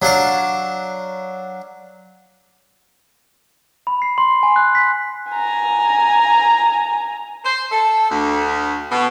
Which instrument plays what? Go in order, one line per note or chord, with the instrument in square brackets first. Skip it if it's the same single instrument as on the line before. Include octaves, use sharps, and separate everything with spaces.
[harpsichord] F#3 D4 F5 A5
[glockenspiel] B5
C7
C6
G#5
F#6
B6
[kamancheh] G#5 A#5
[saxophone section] C5
A4
D2
B2